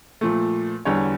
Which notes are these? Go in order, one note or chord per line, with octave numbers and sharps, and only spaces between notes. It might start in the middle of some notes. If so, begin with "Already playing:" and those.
A#2 F3 A3
E2 D3 G3 C#5